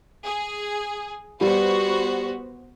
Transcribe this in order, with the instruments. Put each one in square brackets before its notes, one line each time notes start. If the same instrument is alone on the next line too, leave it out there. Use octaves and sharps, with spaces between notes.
[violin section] G#4
[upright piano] G3 [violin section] B3 F#4 C5